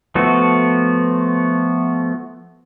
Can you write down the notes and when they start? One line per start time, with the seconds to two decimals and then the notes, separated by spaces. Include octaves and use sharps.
0.15 F3 A3 B3 F#4